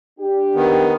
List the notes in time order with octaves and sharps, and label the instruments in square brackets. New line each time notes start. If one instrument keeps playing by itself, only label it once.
[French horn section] D4 G4
[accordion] D#3 B3